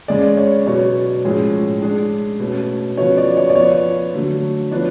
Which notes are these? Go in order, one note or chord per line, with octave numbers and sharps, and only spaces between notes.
C#3 G#3 C#4 G#4 D5
C#5
B2 F#3 C#4 C#5
A2 F3 G#3 C#4 G#4
G#3 D4 G#4
B2 A3 C#4
C#3 F3 B3 F#4 C#5
D5
C#5
D5
F3 B3 F4 C#5
D3 F#3 A3
F3 B3 D4 C#5